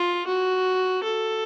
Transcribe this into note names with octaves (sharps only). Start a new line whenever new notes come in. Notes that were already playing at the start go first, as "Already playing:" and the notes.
Already playing: F4
F#4
A4